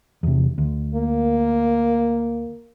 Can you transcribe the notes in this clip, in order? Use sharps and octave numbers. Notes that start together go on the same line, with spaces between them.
E2 C3
D2
A#3